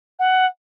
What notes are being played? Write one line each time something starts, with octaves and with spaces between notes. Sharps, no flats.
F#5